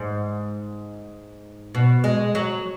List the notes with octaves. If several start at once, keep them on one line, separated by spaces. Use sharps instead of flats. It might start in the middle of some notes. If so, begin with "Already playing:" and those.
Already playing: G#2
B2
G#3
F#3